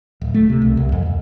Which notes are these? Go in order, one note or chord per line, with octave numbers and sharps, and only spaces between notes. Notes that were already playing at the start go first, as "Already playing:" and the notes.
D1
A3
C3
C2
C2
F2
D#2